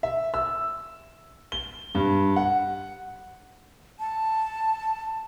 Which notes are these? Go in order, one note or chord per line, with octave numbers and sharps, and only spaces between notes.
E5
E6
G7
G2
F#5
A5